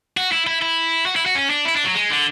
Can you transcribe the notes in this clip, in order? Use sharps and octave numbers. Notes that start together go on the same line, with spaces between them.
F#4
E4
E4
E4
F#4
E4
F#4
C#4
D4
E4
D4
F#3
G#3
D3